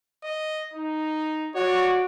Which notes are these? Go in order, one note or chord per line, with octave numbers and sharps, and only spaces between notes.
D#5
D#4
F#4 C#5 D5